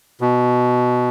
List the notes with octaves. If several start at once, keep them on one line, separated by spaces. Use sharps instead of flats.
B2